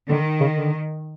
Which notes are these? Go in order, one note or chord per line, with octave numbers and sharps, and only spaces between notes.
D3 D#3
C#3
D3